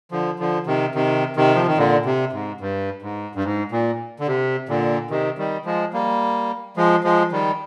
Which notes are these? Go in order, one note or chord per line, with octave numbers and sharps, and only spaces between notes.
D3 F3
D3 F3
C3 D#3
C3 D#3
C3 D#3
F3
D#3
A#2 D3
C3
G#2
G2
G#2
G2
G#2
A#2
D3
C3
A#2 D3
C3 D#3
D#3 G3
F3 G#3
G3 A#3
F3 G#3
F3 G#3
D#3 G3